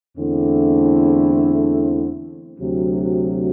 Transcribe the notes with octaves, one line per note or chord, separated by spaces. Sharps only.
E2 D3 A3 C4 E4
D2 C3 F#3